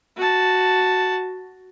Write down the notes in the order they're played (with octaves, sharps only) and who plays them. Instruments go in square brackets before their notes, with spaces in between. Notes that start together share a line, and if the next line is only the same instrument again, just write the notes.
[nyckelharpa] F#4 A5